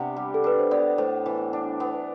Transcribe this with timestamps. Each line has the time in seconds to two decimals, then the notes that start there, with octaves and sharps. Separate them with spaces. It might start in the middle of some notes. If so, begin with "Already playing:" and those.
Already playing: C3 B3 D4 F#5
0.16 G3
0.34 A4
0.44 D4 B4
0.59 C5
0.71 B3 D5
0.98 A2 C5
1.26 E3
1.53 D4
1.80 B3